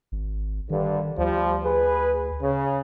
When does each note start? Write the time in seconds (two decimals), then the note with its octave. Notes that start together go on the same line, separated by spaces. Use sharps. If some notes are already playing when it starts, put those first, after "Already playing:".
0.12 G#1
0.70 G2 D3 D#3
1.18 D2 F3 G3
1.65 G#4 B4
2.42 C#3